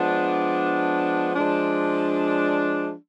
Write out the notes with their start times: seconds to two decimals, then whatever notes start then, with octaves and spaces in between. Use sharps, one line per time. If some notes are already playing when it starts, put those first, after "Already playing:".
Already playing: F3 G#3 B3 D4
1.34 F3 G#3 D4